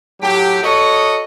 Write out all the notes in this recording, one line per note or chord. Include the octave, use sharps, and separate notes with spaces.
A2 F#3 G4
F#4 A4 C#5 D#5